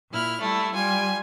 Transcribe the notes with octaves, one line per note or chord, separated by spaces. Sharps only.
A#2 E4 F6
G3 A3 E4
G3 F4 G#5